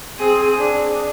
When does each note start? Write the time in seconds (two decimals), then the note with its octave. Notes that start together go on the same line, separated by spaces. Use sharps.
0.19 C4 G#4
0.59 D4